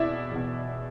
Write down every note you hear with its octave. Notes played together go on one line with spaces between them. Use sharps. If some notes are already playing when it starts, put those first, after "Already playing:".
Already playing: E2 B2 E4 D5 E5
E2 B2